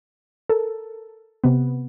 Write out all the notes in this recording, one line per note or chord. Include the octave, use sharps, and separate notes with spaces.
A4 A#4
C3 B3